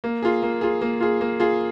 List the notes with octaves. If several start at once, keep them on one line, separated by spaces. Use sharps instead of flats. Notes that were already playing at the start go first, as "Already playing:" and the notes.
A#3
F4 G#4
A#3
F4 G#4
A#3
F4 G#4
A#3
F4 G#4